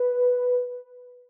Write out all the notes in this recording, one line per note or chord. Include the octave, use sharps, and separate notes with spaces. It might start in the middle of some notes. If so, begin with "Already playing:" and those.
Already playing: B4